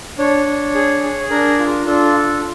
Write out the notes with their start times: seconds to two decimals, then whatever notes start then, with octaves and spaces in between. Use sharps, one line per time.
0.18 D4 C#5
0.46 D4
0.74 G#4
1.03 G#4
1.30 D4 A#4
1.59 F4
1.86 D4 A4
2.15 F4